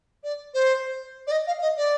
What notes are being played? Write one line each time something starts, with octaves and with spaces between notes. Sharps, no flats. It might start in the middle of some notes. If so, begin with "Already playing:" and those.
D5
C5
D5
D#5
F5
D#5
D5